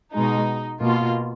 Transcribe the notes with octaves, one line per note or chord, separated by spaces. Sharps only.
B2 G#3 D#4
B2 A#3 F4